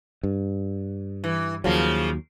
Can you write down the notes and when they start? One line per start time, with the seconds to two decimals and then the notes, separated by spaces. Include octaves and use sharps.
0.23 G2
1.24 E3
1.64 D#2 C#3 F3 F#3 A#3